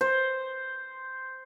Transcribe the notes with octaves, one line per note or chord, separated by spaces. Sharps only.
C5